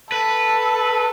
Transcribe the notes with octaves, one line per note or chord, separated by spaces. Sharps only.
A4 B4